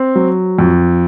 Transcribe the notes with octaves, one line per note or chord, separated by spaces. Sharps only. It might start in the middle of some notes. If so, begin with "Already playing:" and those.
Already playing: C4
F#3
F2